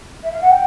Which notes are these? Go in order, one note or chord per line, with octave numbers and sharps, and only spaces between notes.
E5
F5
F#5
G5